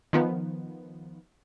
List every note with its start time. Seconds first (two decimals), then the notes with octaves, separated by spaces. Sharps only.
0.13 D#3 F3 B3